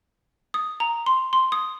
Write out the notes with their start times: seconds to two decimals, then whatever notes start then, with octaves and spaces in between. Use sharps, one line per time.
0.54 D#6
0.80 A#5
1.06 C6
1.33 C6
1.52 D#6